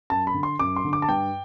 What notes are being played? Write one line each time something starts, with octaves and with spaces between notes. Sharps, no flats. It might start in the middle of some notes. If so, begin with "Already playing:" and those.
F#2 A5
B5
D3
C6
F#2 D6
C6
D3
D6
A5
G2 G5